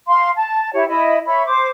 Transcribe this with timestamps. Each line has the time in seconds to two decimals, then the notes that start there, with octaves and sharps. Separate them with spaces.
0.08 F5 C6
0.36 A5
0.73 E4 G4 C#5
0.88 E4 D#5 B5
1.27 C#5 E5 B5
1.46 C5 D6